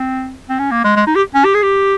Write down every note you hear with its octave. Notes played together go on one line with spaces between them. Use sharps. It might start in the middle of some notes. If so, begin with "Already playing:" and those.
Already playing: C4
C4
C#4
A#3
G#3
G#3
D#4
G4
C#4
G4
G#4
G4